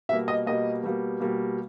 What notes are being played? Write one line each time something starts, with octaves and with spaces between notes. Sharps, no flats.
B2 G3 A#3 E5
D#5
B2 G3 A#3 D#5
B2 G3 A#3
B2 G3 A#3